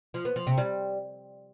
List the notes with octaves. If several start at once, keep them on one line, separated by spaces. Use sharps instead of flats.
F3
B3
F3
C3
G3